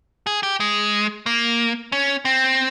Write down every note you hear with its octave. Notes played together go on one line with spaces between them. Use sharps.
G#4
G4
G#3
A#3
C#4
C4